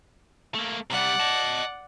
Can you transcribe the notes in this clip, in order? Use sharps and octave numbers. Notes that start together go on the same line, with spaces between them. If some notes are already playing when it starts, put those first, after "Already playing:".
A3 A#3
C3 G3 D5 F#5
D#5 A5